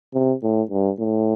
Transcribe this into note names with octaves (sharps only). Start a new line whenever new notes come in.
C3
A2
G2
A2